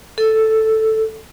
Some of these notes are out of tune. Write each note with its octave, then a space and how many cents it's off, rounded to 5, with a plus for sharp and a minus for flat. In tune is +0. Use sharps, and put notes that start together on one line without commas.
A4 +0